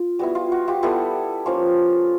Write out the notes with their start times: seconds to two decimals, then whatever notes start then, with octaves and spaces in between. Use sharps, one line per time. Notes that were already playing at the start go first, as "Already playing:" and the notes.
Already playing: F4
0.19 G3 B3 E4 F#4
0.35 F4
0.52 F#4
0.68 F4 G4
0.83 G3 B3 E4 G4 A4
1.46 F3 A#3 C#4 F4